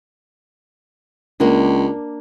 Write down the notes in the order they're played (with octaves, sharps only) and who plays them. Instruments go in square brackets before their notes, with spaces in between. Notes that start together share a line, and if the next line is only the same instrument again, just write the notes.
[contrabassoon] C#2 [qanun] A#3 D4